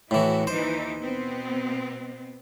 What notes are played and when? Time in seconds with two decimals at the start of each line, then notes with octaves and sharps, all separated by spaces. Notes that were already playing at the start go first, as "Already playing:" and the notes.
0.11 A2 E3 E4 F#4
0.47 D#2 E3 D#4 C5
0.98 B2 B3 C4